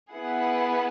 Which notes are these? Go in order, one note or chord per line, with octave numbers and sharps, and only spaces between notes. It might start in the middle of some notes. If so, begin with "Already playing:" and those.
B3 E4 G#4 F#5